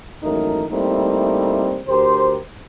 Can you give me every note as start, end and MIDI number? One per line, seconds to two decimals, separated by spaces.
0.23 0.65 32
0.23 0.65 42
0.23 0.65 52
0.23 0.65 57
0.23 0.65 63
0.23 0.65 70
0.70 1.80 55
0.70 1.80 57
0.70 1.80 58
0.70 1.80 60
0.70 1.80 63
0.70 1.80 64
1.88 2.36 38
1.88 2.36 67
1.88 2.36 70
1.88 2.36 72